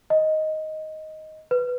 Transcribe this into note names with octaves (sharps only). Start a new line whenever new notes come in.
D#5
B4